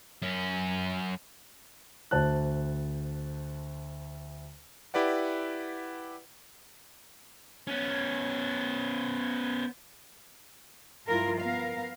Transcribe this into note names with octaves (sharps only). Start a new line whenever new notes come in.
F#2 C#4
D2 C5 A5 F#6
E4 G4 B4 D5 F#5
B3 C#4
G2 F3 E4 F4 A#4
B3 A#4 F5